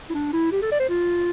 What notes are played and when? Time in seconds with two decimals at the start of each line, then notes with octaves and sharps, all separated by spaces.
0.10 E4
0.14 D4
0.33 E4
0.52 G4
0.62 A4
0.71 D5
0.80 C5
0.89 F4